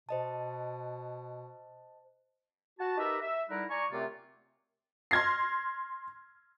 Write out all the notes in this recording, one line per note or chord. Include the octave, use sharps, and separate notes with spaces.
B2 C5 D#5 A5
F#4 A5
D#4 G4 A#4 B4 E5 A#5
E5
D3 G3 D#4 E4 A#4 B4
D5 G#5 A#5 C#6
F#2 C3 A3 C4 F4 D5
C6 F6 G#6 A#6 C7